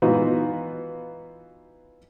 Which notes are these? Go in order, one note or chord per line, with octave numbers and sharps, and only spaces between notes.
E3 B3 D#4 F4 F#4